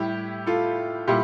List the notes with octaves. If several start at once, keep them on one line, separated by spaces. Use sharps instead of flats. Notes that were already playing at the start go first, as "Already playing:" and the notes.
Already playing: A2 G3 E4 G4
F4 A4
A#2 G3 E4 G4